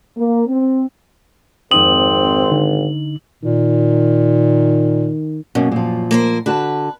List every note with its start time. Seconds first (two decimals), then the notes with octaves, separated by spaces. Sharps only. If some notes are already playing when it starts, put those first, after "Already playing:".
0.17 A#3
0.47 C4
1.71 G#1 F2 C4 D#4 D#6 F#7
2.51 D3 D#4
3.43 A#2 D#3
5.55 F#2 B2 A#3 C#4
5.72 A#2 F3
6.11 A#3 A#4 C5
6.46 D3 F#4 B4 A5